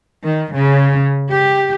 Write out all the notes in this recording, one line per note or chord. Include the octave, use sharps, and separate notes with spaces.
D#3
C#3
G4